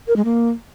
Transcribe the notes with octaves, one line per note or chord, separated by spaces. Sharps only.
A#4
G#3
A#3